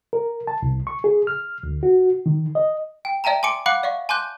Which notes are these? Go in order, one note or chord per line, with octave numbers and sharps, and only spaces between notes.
A#4
A5
C2
C#6
G#4
F6
D2
F#4
D#3
D#5
G5
D5 E5 G5 A5 A#5
G#5 C6 D6 C#7 D7
F5 F#5 B5 D6 F#6 C#7
D5 E5 F5 C#6
G#5 A5 C6 D6 F#6 G6